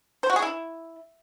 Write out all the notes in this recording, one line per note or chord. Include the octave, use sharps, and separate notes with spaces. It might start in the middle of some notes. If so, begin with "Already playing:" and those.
C5
F#4
G#4
E4